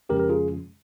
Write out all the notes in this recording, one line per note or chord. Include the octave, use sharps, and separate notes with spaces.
F2 C#3 F3 G#3 C#4 G4 A#4
A#4
F4 G#4